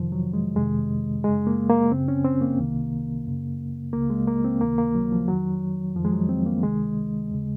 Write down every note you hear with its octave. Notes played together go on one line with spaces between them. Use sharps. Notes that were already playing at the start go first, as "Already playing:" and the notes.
Already playing: F2 C3 D#3 F3
F#3
G#3
F2 C3 D#3 G#3
F#2 C#3 G#3
A#3
A#3
F#2 C#3 C4
C#4
C4
A#3
C2 C3 D#3
F#2 C#3
C#2 C#3 A#3
G#3
A#3
C4
C#2 C3 D#3 A#3
A#3
F#3
F3
F2 D#3 F#3
F2 D#3 F3
G#3
F#3
C4
A#3
C#2 C3 D#3 G#3
D#2 C#3